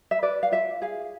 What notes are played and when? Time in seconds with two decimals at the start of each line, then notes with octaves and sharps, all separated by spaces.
0.11 E5
0.22 B4 D5
0.43 F5
0.52 F4 E5
0.82 G#4 F5